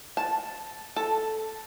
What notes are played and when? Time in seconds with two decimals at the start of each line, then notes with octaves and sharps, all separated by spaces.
0.17 A5
0.96 A4